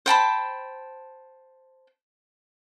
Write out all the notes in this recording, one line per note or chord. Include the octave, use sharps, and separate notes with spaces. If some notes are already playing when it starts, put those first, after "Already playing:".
C5 G5 A5 B5